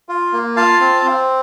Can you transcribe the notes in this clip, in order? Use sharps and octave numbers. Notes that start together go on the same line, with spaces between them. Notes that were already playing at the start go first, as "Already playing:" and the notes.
F4
A#3
F4 F5 A5
C4
C4